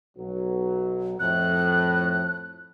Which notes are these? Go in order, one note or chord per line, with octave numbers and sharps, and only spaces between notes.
B1 F#3
F2 A2 F#6